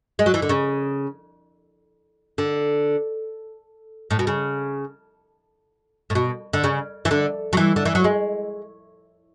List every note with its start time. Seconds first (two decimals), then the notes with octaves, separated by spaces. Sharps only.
0.19 G#3
0.26 F#3
0.34 E3
0.42 D3
0.49 C#3
2.38 D3
4.11 A2
4.19 B2
4.27 C#3
6.10 A2
6.15 B2
6.53 D3
6.64 C#3
7.05 E3
7.11 D3
7.53 F#3
7.57 E3
7.76 D3
7.85 E3
7.95 F#3
8.04 G#3